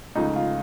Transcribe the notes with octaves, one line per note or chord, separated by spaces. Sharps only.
C#2 C#3 F3 A3 D#4
F4